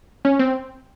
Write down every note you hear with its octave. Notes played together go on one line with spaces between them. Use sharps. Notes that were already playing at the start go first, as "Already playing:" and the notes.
C#4
C4